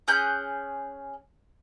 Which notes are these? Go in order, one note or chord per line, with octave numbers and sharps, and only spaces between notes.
C#4 G#4 F#6 G6